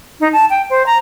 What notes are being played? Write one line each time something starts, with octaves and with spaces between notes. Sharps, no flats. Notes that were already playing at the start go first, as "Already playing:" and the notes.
D#4
A5
G5
C5
A#5